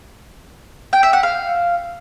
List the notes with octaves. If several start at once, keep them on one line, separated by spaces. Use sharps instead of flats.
G5
E5
F#5
F5